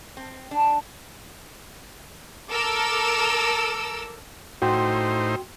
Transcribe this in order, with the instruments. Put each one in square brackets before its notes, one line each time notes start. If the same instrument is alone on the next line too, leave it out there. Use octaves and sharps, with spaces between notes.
[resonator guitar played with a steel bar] C4
D4
[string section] A4 A#4 D6 E6
[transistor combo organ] A2 D#4 C5 [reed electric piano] F#4 G5 C6